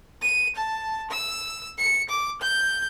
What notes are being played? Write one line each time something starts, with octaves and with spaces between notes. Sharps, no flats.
D#7
A5
E6
C#7
D6
G6